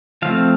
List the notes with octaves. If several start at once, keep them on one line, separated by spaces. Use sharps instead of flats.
F3 A3 C4 F5